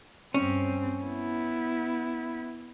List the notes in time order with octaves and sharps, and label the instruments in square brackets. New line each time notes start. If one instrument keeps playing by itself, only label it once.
[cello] G2 C4 [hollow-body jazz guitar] C#4
[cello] B3 E4